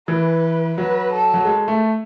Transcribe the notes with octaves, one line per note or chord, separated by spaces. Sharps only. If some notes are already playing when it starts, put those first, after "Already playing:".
E3 B4
F#3 B4
A4
F#3
G#3
A3